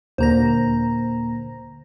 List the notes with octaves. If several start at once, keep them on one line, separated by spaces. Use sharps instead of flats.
D#2 A#2 D3 A#3 C5 A#5 A#6